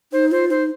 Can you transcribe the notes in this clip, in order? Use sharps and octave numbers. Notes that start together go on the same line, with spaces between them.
D#4 C5
F4 C5
D#4 C5